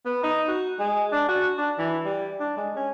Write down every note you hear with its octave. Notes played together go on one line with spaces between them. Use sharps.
B3
D#4
F#4
G#3
D4
F#4
D4
E3
G3
D4
G#3
C#4